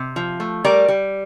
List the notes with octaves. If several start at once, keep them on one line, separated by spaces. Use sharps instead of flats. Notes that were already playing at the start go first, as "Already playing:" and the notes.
Already playing: C3
F3
A3
G3 A#4 D5
G3